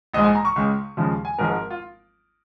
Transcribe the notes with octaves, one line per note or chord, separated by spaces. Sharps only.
A#1 G#2 G#3 D#5
G#5
A#5
C#6
C#2 C#3 G#3
D#2 C#3 F3 G#3
G#5
G#1 G#2 F3 G#3 A#4
A#4
F4